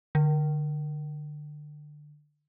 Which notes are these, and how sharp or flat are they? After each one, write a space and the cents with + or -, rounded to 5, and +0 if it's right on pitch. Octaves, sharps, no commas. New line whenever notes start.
D3 +20